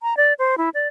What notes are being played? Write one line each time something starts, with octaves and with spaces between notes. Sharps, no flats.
A#5
D5
C5
E4
D5